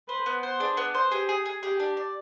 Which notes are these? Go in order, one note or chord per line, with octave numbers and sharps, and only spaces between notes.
B4 C5
B3
C5
D4 G#4
B3
C5
G4 G#4
G#4
G#4
G4 G#4
D4
D5